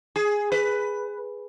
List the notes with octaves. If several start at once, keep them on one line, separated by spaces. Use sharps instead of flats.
G#4
B4